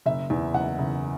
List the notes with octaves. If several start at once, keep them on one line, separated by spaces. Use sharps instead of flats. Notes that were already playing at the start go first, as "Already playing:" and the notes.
F#1 E5
E2
F#1 F#5
F#1